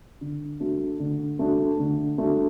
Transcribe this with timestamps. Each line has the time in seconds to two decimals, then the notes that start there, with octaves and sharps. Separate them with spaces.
0.21 D3
0.60 A3 D4 F#4
1.00 D3
1.39 A3 D4 F#4
1.79 D3
2.18 A3 D4 F#4